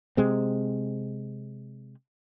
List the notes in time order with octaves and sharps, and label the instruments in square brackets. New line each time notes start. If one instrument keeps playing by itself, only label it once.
[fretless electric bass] C3 G#3 C4